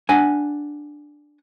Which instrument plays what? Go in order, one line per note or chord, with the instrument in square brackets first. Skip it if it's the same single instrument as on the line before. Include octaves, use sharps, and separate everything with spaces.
[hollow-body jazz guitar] D4 F#5 G#5